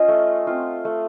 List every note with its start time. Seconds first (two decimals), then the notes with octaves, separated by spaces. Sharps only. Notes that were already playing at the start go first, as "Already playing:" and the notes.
Already playing: C#4 F4 D#5
0.08 A3
0.47 C4 F4
0.85 A3